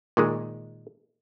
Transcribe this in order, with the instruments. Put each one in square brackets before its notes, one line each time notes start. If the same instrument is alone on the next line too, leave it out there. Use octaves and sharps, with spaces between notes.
[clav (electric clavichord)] A#2 D#3 G#3